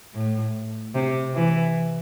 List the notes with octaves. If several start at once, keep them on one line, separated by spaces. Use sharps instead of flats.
A2
C3
E3